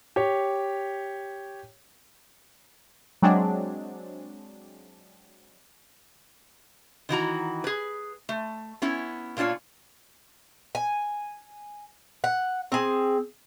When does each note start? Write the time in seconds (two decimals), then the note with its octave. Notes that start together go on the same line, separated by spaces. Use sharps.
0.16 G4 C#5
3.22 F#3 G#3 C4 D4
7.09 D#3 E3 F#4 A#5
7.64 G#4 B4
8.29 A3
8.82 B3 C#4 E4
9.37 A#2 A#3 D4 F4 C#5
10.75 G#5
12.24 F#5
12.72 C4 G#4